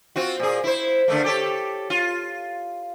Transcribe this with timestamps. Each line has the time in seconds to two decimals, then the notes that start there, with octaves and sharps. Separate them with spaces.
0.16 C4 F4 F#4
0.40 A#2 G#4
0.64 E4 C5
1.08 D3 A3 A#3
1.24 G4 A4 C#5
1.90 F4